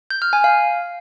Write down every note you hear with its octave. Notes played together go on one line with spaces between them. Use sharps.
G6
F6
G#5
F5